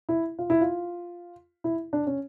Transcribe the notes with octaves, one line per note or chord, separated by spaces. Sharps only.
E4
F4
E4
F4
E4
D4
C#4